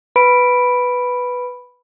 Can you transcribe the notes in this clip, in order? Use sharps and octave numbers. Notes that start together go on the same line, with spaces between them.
B4 B5 D7